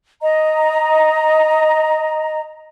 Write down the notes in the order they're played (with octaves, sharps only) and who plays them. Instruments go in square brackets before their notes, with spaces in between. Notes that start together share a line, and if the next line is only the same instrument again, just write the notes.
[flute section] D#5 A#5